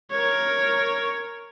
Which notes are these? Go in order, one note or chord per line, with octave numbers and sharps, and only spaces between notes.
A#4 C#5